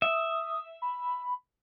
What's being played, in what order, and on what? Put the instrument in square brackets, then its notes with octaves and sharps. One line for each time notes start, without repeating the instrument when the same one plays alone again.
[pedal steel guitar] E5 [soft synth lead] D#6
[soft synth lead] B5